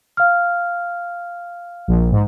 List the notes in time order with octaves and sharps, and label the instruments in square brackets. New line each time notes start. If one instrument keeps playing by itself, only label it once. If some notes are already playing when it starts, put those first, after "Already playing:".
[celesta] F5 F6
[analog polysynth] A#1
G#2